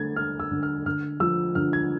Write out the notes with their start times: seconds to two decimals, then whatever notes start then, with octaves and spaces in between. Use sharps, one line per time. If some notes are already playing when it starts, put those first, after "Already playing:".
Already playing: D3 A3 G#6 A6
0.16 D4 F6
0.40 E6
0.51 D3
0.63 F6
0.86 D3 F6
1.20 F3 E6
1.55 D3 F6
1.73 G#6